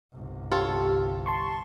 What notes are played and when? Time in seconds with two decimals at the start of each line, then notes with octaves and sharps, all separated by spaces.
0.13 G1 C2
0.52 F4 G4 A4 C#5
1.26 A5 C6 C#6